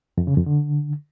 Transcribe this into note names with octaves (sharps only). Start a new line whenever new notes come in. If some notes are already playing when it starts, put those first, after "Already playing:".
F2
C#3
F2
D3